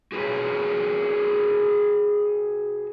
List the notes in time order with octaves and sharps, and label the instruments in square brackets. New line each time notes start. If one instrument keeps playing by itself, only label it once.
[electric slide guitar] F#4 G#4 B4 C#5